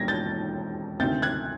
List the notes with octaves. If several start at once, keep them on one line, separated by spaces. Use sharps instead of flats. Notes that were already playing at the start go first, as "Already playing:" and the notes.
Already playing: E1 D#2 D3 F3 G#6 A#6
G6 A6
D2 C3 D#3 G6 A6
F#6 G#6